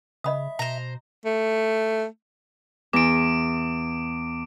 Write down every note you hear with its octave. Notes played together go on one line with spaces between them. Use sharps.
C#3 D#5 E5 B5 D#6
B2 C5 A#5
A3
E2 D6 D7